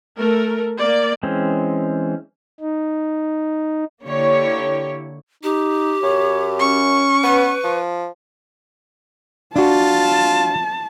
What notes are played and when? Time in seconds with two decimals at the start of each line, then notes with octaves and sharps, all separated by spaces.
0.17 A3 A#4
0.78 A#3 D5
1.23 E3 G#3 C4 C#4
2.60 D#4
4.04 D3 A#3 E4 G4 C#5
5.43 D#4 G4
6.03 F#2 C#5
6.60 C#4 C#6
7.23 B3 B4
7.64 F3
9.56 D4 F4 F#4 A5